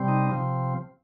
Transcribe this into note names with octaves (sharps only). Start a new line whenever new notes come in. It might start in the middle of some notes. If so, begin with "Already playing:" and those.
Already playing: C3 G3 C4
D#4
C3 F3 C4